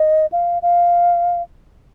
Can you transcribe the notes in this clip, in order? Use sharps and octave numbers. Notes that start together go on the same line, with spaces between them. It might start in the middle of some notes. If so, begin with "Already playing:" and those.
Already playing: D#5
F5
F5